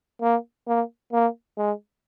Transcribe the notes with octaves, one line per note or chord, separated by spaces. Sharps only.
A#3
A#3
A#3
G#3